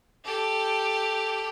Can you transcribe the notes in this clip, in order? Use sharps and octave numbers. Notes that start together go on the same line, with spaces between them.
G4 A4